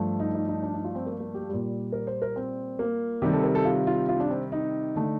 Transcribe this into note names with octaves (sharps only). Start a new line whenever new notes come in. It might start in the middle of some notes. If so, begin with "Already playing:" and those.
Already playing: G2 F3 A3
D#4
D#4
D#4
D4
D#4
F4
C4
A#3
A#3
G4
A#2 G3
A#4
C5
A#4
C4
A#3
C3 D#3 G3 G4
A4
A#4
A4
F4
F4
F4
D4
C4
D#4
D3 A3